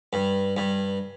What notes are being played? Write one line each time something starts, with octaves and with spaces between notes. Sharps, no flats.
G2
G2